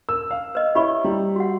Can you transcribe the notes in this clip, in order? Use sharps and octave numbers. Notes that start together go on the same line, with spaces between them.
A#4 E6
F5
B4 D#5
E4 G4 C#5 B5 C#6
G3 E4
F#4 F#5